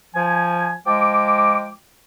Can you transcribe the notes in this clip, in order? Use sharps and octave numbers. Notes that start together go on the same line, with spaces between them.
F3 G#5
F3 G#3 G5 D6